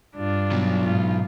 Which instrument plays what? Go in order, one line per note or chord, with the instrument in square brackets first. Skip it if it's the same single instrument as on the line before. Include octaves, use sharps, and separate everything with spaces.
[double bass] G2 [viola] D4 F4
[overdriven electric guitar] B2 F#3
[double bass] G#2 [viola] F4